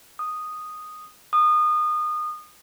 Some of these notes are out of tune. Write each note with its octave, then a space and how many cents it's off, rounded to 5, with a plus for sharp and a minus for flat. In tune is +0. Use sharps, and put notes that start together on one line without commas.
D#6 -5
D#6 -25